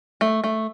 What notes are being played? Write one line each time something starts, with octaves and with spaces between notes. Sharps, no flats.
A3
A3